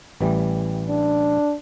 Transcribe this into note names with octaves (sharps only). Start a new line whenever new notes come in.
A1 E3 G3
D4